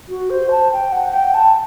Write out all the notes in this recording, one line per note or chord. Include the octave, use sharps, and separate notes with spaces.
F#4
C5
A5
G5
F#5
G5
A5